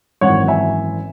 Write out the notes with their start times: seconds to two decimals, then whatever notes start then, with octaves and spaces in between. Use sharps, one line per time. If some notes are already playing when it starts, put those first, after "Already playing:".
0.21 G#1 F#2 E3 C#5 F#5
0.48 E5 G#5